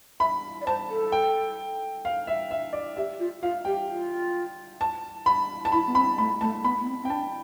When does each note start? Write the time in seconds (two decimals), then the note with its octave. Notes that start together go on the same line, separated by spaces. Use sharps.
0.20 E5 B5
0.61 D5
0.66 C5 A5
0.89 A4
1.12 G5
2.05 F5
2.27 E5
2.51 E5
2.73 D5
2.96 G4 E5
3.20 F4
3.42 F4 F5
3.65 G4 G5
3.89 F4
4.81 A5
5.26 B5
5.65 A5
5.72 E4 B5
5.87 B3
5.95 C4 B5
6.18 A3 B5
6.41 A3 A5
6.59 A3
6.64 B3 B5
6.82 B3
6.87 C4
7.02 C4
7.05 G5
7.10 D4 A5